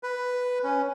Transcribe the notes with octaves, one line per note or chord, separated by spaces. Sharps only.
B4
C#4